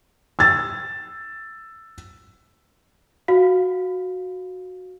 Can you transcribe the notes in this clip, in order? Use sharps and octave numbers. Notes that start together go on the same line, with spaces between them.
E6 A6
F#4 F5